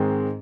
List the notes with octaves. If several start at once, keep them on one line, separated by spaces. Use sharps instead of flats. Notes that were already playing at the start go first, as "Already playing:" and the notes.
Already playing: G#2 D#3 G#3 C4